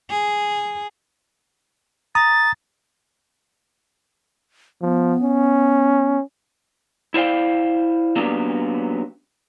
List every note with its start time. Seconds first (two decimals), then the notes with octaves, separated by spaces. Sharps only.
0.11 G#4
2.15 A#5 D#6 A6
4.82 F3 B3
5.22 C#4
7.14 E4 C5 D5 F5 G5
8.16 F#3 A#3 B3 C#4 D4 G4